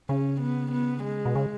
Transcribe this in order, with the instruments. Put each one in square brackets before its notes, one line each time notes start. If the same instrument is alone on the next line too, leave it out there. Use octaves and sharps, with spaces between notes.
[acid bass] C#3 [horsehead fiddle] C#4
[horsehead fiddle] B3
B3
G#3
[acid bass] B2
C#3